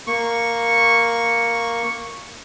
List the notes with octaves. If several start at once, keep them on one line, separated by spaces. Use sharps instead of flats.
A#3 C#6